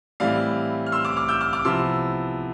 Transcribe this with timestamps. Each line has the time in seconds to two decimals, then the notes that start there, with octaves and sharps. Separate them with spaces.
0.20 A2 E3 G3 C4 E4 D5 F5
0.86 F6
0.92 C6 E6
1.05 D6 F6
1.16 D6 F6
1.28 E6 G6
1.41 D6 F6
1.53 D6 F6
1.65 C3 F3 B3 E4 C6 E6